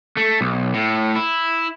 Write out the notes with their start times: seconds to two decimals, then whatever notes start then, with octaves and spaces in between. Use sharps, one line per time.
0.17 A3
0.41 B1
0.74 A2
1.16 E4